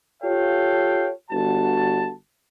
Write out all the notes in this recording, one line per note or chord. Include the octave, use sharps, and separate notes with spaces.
F4 G4 A4 C#5 F5 G5
G1 F#4 A5